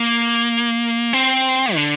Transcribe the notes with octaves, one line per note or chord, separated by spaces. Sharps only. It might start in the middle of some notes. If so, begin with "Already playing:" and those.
Already playing: A#3
C4
D3